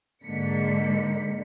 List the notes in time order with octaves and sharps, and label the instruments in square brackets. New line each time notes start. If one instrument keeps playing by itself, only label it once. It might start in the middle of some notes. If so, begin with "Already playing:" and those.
[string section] G#2 D3 A#3 B6 C#7